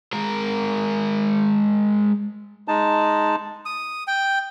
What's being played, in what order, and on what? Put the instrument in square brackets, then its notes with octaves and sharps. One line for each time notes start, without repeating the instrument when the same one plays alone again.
[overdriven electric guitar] G#3 A#4
[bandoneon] G#3 D#4 A5
[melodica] D#6
G5